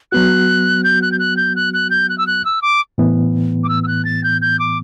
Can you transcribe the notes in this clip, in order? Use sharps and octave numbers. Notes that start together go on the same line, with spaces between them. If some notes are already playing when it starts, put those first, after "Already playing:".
F#3 B3 F#4 F#6
G6
F#6
G6
F#6
G6
F#6
F#6
G6
F#6
E6
F#6
E6
D6
A2 E3 B3
D6
E6
E6
F#6
A6
G6
G6
D6